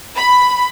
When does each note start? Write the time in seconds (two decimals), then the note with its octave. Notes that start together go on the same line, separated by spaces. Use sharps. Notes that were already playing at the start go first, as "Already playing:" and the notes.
0.16 B5